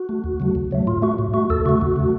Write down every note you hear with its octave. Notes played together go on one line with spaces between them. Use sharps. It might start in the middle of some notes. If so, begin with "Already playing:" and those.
Already playing: F#4
A3
D#2
C#3 F#3 A3
D#2
C#3 F#3 A3
A2 F4
A3 F#4
A2
A3 F#4
D#2 A4
C#3 A3 F#4
D#2
C#3 A3